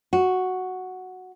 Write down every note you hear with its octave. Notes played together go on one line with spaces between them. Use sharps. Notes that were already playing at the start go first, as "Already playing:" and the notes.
F#4